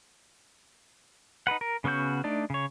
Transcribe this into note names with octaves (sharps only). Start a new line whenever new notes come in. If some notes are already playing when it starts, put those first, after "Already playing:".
D#4 A4 B4 F#5
A#4
C#3 B3 C#4 F#4 G6
A3 D4 D#4 D5
C#3 C#5